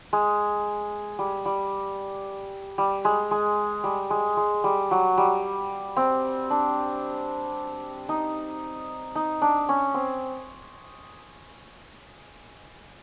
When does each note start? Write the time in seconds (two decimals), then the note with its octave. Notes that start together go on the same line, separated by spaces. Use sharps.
0.13 G#3
1.19 G3
1.46 G3
2.78 G3
3.05 G#3
3.31 G#3
3.84 G3
4.10 G#3
4.37 G#3
4.64 G3
4.91 F#3
5.18 G3
5.97 C4
6.50 D4
8.09 D#4
9.15 D#4
9.42 D4
9.69 C#4
9.94 C4